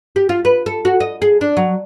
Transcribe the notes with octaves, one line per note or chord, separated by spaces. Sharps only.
G4
F4
B4
A4
F#4
D#5
G#4
D4
F#3